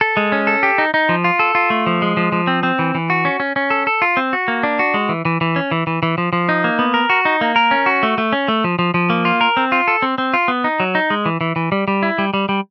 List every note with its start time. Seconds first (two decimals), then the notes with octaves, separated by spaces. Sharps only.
0.01 A4
0.17 G#3
0.32 C#4
0.47 A4
0.63 G4
0.78 D#4
0.94 D#4
1.09 F3
1.24 F4
1.39 A4
1.55 F4
1.70 A3
1.87 F3
2.02 G#3
2.17 F3
2.32 F3
2.47 C4
2.63 C4
2.79 E3
2.95 E3
3.10 F#4
3.25 C#4
3.40 C#4
3.56 C#4
3.70 A4
3.87 A4
4.02 F4
4.17 C4
4.33 F#4
4.48 A#3
4.63 D4
4.79 F#4
4.94 G#3
5.09 E3
5.25 E3
5.41 E3
5.56 C#4
5.71 E3
5.87 E3
6.03 E3
6.18 F3
6.33 F3
6.49 D#4
6.64 A#3
6.79 B3
6.94 A#4
7.10 F#4
7.25 D#4
7.41 A#3
7.56 A#4
7.71 C#4
7.86 F#4
8.03 A3
8.18 A3
8.33 C#4
8.48 A3
8.64 F3
8.79 F3
8.94 F3
9.10 A#3
9.25 F4
9.41 A#4
9.57 C4
9.72 F4
9.88 A4
10.02 C4
10.18 C4
10.34 F4
10.48 B3
10.64 D#4
10.80 F#3
10.95 D#4
11.10 G#3
11.26 E3
11.41 E3
11.56 E3
11.72 G3
11.88 G3
12.03 E4
12.18 G3
12.34 G3
12.49 G3